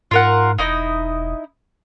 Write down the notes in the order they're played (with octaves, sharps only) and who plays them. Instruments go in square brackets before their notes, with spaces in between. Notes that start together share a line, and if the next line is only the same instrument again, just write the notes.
[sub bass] G#2 [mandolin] F4 A#4 F#5
[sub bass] E1 [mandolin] D#4 E4 D#5